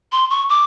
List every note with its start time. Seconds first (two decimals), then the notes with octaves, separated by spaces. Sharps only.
0.12 C6
0.30 C#6
0.49 D6